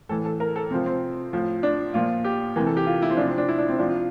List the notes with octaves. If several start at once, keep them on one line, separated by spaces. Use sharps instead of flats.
A2 E3 A4
A4
A#4
A4
C3 F3 C4
C4
A2 F3
D4
A#2 F3 F4
G4
C3 E3 A#4
A4
G4
F4
E4
C4
C3 F3 D4
C4
D4
E4
D4
C4
C3 F3 D4
F4